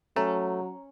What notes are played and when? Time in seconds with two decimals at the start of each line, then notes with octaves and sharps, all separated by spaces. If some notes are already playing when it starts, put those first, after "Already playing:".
0.16 F#3 A3 C#4 A#5